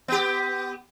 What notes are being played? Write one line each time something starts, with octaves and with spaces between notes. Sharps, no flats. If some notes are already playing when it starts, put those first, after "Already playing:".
B3 G4